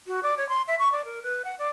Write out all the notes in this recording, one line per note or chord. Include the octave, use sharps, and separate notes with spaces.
F#4
D5
C#5
C6
E5
C#6
D5
A#4
B4
F#5
D5